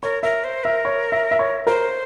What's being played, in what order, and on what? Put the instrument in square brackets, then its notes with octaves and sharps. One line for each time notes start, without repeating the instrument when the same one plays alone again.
[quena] A#4 [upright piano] C#5
[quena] A#4 [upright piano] E5
[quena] C5
[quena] A#4 [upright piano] E5
[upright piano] C#5
E5
E5
C#5
[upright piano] A#4 [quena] C5